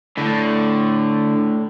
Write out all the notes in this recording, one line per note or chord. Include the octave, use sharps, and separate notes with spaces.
A2 D3